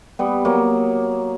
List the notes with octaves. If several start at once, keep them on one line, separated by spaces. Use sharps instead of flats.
G3 B3
F#3 A#3